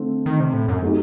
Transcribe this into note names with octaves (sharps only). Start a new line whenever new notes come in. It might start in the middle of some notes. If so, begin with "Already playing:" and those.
Already playing: D3 A3 C4
D#3
C3
A2
F#2
F#3 A3 D#4 G4